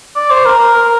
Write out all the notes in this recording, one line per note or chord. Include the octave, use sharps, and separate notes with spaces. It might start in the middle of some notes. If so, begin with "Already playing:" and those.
D5
C5
A#4
A#4